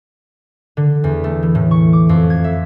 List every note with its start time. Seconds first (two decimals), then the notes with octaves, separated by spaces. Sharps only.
0.77 D3
1.04 E2
1.24 A3
1.43 E3
1.55 A2
1.71 C#6
1.93 D6
2.09 F2
2.30 G#6
2.44 E5